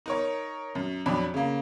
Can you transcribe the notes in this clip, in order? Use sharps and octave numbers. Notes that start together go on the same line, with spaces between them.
D#4 A#4 C#5
F#2
F2 F#3 D4 B5
C#3 A#3